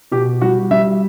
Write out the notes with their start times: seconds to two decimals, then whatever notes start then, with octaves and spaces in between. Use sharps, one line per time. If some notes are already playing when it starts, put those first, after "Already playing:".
0.11 B2 G4
0.41 G3 F#4
0.71 G3 E5